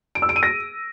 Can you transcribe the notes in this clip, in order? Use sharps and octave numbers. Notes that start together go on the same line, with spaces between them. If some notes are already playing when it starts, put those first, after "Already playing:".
D7
E6
D7
D#7
A#6